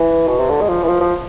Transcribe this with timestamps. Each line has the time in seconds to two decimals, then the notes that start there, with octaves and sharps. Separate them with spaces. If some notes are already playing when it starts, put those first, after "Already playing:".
Already playing: E3
0.28 B2
0.39 C3
0.49 D3
0.61 G#3
0.68 F3
0.83 E3
0.88 F3
1.01 F3